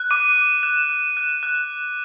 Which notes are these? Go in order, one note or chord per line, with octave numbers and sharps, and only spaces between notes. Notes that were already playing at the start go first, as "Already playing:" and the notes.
Already playing: F#6
D6 D#7
D6
F#6 E7
F#6
F#6
F#6